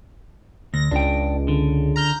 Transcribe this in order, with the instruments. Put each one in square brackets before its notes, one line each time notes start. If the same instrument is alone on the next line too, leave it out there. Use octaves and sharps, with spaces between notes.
[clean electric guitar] D2 [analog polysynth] A#6
[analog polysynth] C#2 [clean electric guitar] D4 G5
[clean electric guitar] D3
[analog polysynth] A#5 F6 G6